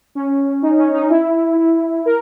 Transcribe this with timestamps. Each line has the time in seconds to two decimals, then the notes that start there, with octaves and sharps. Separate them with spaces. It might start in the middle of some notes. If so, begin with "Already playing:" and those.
0.15 C#4
0.62 D#4
0.79 C#4
0.94 D#4
1.10 E4
1.57 E4
2.06 A#4